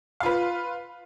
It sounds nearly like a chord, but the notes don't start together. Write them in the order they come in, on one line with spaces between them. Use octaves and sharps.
F5 F4 B4